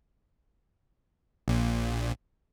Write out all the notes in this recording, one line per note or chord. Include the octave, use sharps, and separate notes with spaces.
A#1 A#2